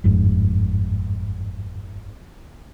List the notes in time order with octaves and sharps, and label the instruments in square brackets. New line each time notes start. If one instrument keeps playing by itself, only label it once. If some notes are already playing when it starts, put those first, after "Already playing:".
[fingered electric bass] G1 F2 G#2